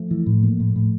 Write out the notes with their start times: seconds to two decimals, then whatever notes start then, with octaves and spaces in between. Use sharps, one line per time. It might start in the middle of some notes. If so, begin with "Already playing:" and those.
Already playing: F3 A3
0.11 E3
0.26 A2
0.43 A#3
0.60 A2
0.76 A2